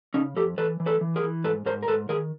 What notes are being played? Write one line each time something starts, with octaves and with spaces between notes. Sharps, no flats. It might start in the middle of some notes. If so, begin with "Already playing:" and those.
C#3 C#4 D#4
F2 G4 A4
E3 A4 B4
E3
A4 B4
E3
G#4 A#4
E3
G#2 A4 B4
G#2 A#4 C5
A#4
G#2 A4 B4
D#3 G#4 A#4